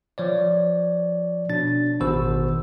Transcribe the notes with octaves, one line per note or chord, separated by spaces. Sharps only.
F3 C#5 D5
B2 D4 A6
A1 B2 D#3 C5 E6